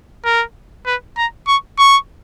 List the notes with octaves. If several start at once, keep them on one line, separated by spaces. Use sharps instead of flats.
A#4
B4
A#5
C#6
C#6